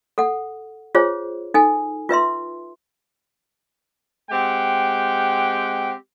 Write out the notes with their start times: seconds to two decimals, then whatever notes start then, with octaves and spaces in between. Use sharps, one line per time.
0.18 A4 F#5
0.95 F4 G#4 C5 C#5
1.54 D#4 A4 G#5
2.09 F4 B4 E5 C6
4.30 G#3 C4 G4 F#5 G5